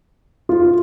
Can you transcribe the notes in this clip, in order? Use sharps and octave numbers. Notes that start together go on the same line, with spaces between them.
F4